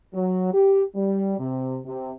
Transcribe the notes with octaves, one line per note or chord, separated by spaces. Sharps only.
F#3
G4
G3
C3
C3